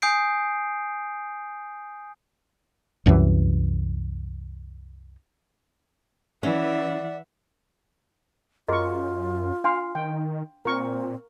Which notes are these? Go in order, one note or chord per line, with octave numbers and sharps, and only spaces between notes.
G#5 D#6 G6 C7 D7
C2 F#2 C3 E3
E3 C#4 D5 E5 F#5
F#2 F4 F#4 G#4 A#4 D#5 C#6
D4 F5 G#5 C6
D#3 G5
A#2 C4 A#4 C#6